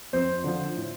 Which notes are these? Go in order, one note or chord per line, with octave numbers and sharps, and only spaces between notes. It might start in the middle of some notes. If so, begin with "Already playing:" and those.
F2 C5
D3 F3
A2